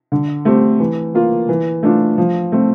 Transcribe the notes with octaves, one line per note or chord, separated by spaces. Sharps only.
D3
A3 C4 G4
E3
A#3 F4
E3
A3 D4 F4
F3
A3 C4